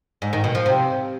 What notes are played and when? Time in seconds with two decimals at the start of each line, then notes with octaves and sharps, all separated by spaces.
0.22 G#2
0.33 D#3
0.44 B2
0.55 F3
0.66 C3